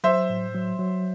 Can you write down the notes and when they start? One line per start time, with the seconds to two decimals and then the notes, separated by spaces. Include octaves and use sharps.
0.04 F#3 C5 E5
0.29 A2
0.55 F#3
0.79 F#3